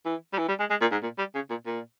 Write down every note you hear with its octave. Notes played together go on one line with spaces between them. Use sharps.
E3
G3
E3
G3
G#3
G#3
A#2
G#2
A#2
G3
C#3
A#2
A#2